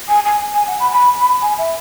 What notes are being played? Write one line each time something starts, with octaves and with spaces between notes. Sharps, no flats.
G#5
G#5
G#5
F#5
B5
B5
B5
G#5
E5